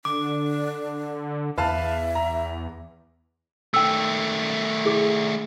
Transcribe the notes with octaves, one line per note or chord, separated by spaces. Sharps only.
D3 D4 D6
E2 B4 E5 F5 A5
A#5
D#3 A3 G5 E6
E4 G#4 D6